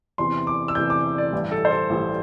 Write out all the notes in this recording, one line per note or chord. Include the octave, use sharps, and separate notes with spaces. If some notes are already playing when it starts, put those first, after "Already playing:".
E2 C3 E3 C6
D6
E6
E2 C3 E3 G6
D6
D5
A1 G2 E3 G3
A4
C5
A4
A1 G2 E3 G3